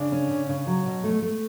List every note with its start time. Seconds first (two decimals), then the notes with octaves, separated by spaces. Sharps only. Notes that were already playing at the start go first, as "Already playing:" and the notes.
Already playing: C#3 D4
0.12 C#4
0.31 C#3
0.49 C#3
0.67 F#3
0.85 B2
1.04 A3
1.22 A3